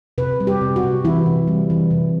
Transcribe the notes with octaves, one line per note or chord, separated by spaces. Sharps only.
C3 B4
G3
G4
C3
F#4
C3
E3 E4
C3
G3
E3
C3